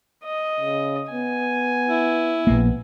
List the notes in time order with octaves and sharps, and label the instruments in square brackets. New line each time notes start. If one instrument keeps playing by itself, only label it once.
[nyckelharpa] D#5
[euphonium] C#3
[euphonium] B3 [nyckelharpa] G#5
[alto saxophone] E4
[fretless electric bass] A#1 A#3 [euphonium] B3